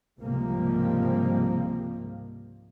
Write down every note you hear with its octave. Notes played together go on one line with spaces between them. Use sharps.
C#2 G#2 C3 F3 G3 A#3